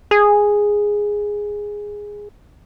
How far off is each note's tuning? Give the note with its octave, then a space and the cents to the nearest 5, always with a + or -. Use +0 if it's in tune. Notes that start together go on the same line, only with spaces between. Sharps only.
G#4 -5